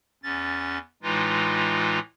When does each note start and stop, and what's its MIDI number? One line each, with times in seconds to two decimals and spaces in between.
0.23 0.78 40
0.23 0.78 61
0.23 0.78 93
1.03 1.99 45
1.03 1.99 52
1.03 1.99 56
1.03 1.99 63
1.03 1.99 65